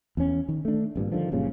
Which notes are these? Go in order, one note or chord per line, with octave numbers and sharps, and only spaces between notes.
E2 C#4
D#3
A3 D4
G#1 G2 A#2
D3 D#3 F3
F#1 G2 A#2 C#3